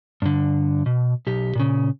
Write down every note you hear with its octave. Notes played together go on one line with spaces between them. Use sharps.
G2 D3
B2
B1 G4
A#2 C#3